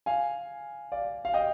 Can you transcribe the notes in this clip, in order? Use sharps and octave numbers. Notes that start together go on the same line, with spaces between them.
F5 G#5
D5 F5
F5
D#5 G5